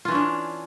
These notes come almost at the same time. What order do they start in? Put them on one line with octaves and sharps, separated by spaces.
F4 E3 C#4 D4